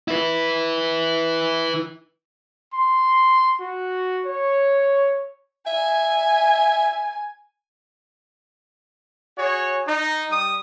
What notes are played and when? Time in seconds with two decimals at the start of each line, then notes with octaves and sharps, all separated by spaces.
0.08 E4 B4
2.74 C6
3.60 F#4
4.26 C#5
5.67 E5 G#5
9.38 F#4 G#4 C#5
9.86 D#4
10.31 G3 D#6